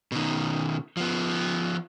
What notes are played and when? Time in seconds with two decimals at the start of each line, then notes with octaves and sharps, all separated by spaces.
0.12 B2 D#3
0.97 F3 B3